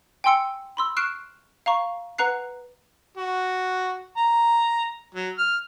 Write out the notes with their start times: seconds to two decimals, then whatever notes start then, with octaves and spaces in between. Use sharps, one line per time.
0.24 G5 G#5 C6 E6 C#7
0.77 B5 C6 E6
0.97 C#6 F6 F#6 C7 D7 E7
1.66 F5 A#5 C#6
2.18 B4 F#5 A#5 F#6 C7
3.17 F#4
4.17 A#5
5.14 F#3
5.38 F6